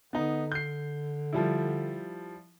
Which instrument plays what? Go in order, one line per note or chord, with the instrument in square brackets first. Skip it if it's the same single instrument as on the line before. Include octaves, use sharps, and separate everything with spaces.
[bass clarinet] D3 [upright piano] B3 D#4
[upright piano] G6 C7
F3 G3 E4